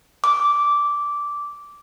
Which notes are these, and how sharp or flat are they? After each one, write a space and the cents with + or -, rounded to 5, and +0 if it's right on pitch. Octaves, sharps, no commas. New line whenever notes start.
D6 -10